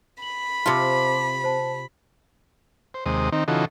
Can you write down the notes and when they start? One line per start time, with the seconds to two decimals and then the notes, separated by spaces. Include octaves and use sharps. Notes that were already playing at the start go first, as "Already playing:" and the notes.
0.22 B5 F#7
0.66 C3 F4 A5 D6
1.44 C5 A5
2.94 C5
3.06 D#2 C3 G#3 C5 D#6
3.32 D#3 C4 D#4
3.48 C#3 E3 D#4 F4 F#4 A4